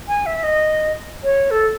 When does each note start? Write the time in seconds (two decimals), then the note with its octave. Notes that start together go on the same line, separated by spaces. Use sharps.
0.08 G#5
0.26 E5
0.43 D#5
1.23 C#5
1.51 A4